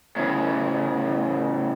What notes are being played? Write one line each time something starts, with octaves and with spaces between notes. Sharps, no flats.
A2 C#3